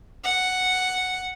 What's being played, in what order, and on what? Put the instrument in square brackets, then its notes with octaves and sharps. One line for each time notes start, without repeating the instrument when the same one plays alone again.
[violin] F#5